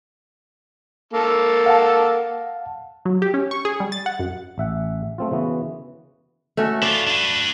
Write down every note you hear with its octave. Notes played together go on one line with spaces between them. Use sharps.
A#3 A4
F5 F#5 A5
F#3
G4
C#4
C#6
G#4
G3
A6
F#5
F#2
A1 E5 F#5
A3 C4 F4
C#3 E3 B3 F#4
A3 C#4 F#4
E4 F4 D5
D4 B4